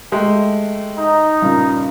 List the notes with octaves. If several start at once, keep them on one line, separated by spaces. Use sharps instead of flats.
G#3 A3 G4
D#4
G2 A#2 C#3